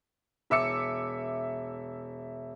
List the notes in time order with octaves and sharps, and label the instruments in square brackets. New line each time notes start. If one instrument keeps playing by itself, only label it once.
[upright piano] E1 E5 D6 E6 C#7